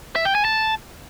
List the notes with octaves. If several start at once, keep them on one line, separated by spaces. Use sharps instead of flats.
E5
G5
G#5
A5